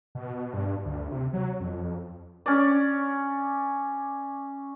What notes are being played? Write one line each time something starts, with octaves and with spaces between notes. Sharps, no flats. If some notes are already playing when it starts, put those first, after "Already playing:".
B2
G2
D2
C3
F#3
F2
C#4 D5